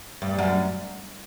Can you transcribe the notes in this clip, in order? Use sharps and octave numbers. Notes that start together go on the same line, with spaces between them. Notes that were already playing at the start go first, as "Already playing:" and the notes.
G2
F#2